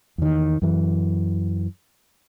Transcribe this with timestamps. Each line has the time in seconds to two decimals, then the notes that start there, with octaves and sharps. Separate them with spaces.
0.18 E2 D#3
0.62 F#2 E3